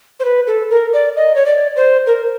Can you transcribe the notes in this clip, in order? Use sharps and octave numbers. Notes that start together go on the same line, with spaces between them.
C5
B4
A4
A#4
D5
D#5
C#5
D5
C5
A#4